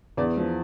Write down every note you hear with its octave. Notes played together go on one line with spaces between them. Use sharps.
E2 D5
F3